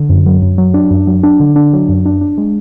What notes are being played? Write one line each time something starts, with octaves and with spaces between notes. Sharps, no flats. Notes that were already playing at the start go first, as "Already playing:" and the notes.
Already playing: D3
F#2
F#3
F#2
F#3
D4
F#2
F#3
D4
D3
D4
F#3
F#2
D4
D4
G#3